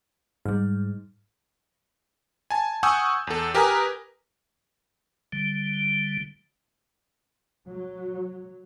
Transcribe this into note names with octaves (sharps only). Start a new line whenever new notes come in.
G#2 G3 F6
G#5 A5
F#5 G#5 C#6 D#6 E6 G6
E2 A4
G4 A#4 B4 G#5 A#5 D#6
D3 G3
F#3